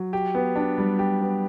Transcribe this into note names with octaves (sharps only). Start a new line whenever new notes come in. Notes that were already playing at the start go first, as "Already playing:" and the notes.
Already playing: F#3
G4
B3
D4
G3
G4
B3